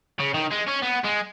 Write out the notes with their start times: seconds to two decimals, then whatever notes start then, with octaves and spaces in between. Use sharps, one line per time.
0.20 C#3
0.34 D#3
0.51 G#3
0.67 C#4
0.82 B3
1.04 G#3